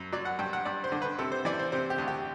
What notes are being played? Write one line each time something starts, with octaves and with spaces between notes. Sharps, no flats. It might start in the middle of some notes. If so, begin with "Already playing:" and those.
Already playing: F#2
F#3 D5
F#5
G2 G5
F#5
G2 D5
C5
D3
B4
C3 A4
C5
E3 D5
C5
C3 C5
G4
D2
G4